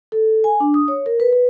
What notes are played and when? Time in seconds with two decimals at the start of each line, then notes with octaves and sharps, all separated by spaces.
0.12 A4
0.44 G#5
0.60 D4
0.74 D#6
0.88 C#5
1.06 A#4
1.20 B4
1.33 B4